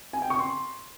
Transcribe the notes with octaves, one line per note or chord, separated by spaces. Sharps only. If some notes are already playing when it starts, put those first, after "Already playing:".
G#5
G5
C#6
C6